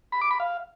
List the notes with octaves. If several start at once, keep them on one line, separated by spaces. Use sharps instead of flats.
B5
D6
B5
F5